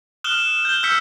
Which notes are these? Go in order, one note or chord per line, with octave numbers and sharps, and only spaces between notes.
D#6 F6 F#6 E7 G7
G6 G7
E6 F6 G6 B6 C#7